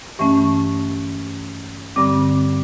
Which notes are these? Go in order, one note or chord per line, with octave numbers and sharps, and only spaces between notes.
G2 E3 A3 C#4 C#6
G2 D3 G3 C4 D6